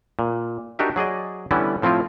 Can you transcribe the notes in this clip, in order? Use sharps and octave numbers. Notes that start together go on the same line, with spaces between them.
A#2
D4 D#4 F#4 G4 A#4 E5
F#3 G#4 D5 D#5
D3 E3 G3 B3 C#4 E4
A2 F3 C4 E4 F4